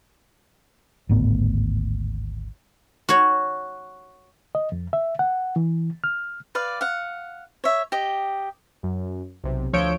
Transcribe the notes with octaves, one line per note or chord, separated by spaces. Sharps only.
G#1 D2 A2 B3
F#4 C#5
D#5
F2
E5
F#5
E3
F6
B4 D5 F5
F5 F#5
C#5 E5
G4 D#5
F#2
B1 C3
D2 F3 C#5 E6 G6 D7